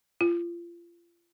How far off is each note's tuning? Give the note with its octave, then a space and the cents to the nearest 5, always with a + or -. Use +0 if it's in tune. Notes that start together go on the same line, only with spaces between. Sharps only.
F4 -30